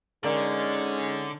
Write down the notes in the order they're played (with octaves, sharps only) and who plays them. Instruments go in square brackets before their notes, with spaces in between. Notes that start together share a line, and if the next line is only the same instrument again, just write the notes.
[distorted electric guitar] D3 [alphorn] G#3 [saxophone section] C#4 D#4 [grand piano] A#4 D5